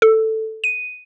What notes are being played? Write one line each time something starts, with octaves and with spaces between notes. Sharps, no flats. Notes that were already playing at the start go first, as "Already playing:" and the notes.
A4
D#7